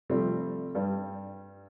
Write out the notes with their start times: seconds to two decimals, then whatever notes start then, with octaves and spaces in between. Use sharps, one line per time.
0.10 C3 F3 G3 A3 C4
0.75 G2 G3